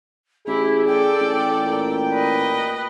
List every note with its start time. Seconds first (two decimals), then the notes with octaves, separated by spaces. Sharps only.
0.47 A1 E4 G4 G#4
0.87 A4 D5 G5
1.20 A1
1.59 A#2
2.13 B4 D#5